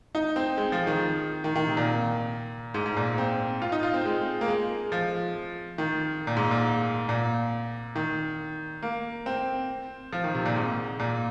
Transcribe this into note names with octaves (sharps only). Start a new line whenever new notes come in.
D#4
C4
G#3
F3
D#3
D#3
D#3
C3
A#2
G#2
G#2
A#2
C4
F4
D#4
F4
C4
G#3
A#3
G#3
F3
D#3
A#2
G#2
A#2
A#2
D#3
A#3
C4
F3
D#3
C3
A#2
G#2
A#2